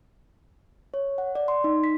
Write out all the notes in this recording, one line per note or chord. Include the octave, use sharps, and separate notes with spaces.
C#5
F#5
D5
C6
D#4
B6